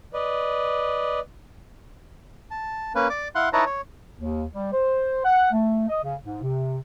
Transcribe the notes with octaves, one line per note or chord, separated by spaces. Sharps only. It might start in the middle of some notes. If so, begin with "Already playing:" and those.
B4 D5 D#5
A5
A#3 C#4 B4
D5 D6
E4 F5 F#5 C6 F#6
D#4 E4 B4 C#5 A5 A#5
C#5
D#2
G3
C5
F#5
A3
D#5
C#3
G#2
C3